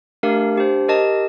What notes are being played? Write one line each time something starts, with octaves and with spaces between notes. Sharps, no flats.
A3 D4 G4 A#4 F5
D4 G4 C5
G4 A#4 D#5 A5